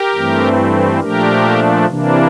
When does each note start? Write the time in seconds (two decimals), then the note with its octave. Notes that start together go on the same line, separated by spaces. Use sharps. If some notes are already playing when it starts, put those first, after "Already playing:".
Already playing: G4 A#4
0.14 G2 E3 A3 C4
1.00 A#2 F3 A3 D4 G4 A#4
1.86 C3 E3 A#3 D4